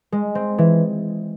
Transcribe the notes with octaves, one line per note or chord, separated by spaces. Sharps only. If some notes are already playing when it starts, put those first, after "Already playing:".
G#3
C4
E3